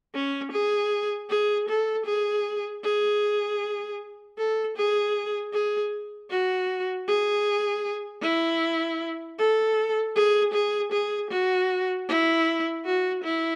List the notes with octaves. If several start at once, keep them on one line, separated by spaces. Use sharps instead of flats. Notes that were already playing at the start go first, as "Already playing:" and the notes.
C#4
G#4
G#4
A4
G#4
G#4
A4
G#4
G#4
F#4
G#4
E4
A4
G#4
G#4
G#4
F#4
E4
F#4
E4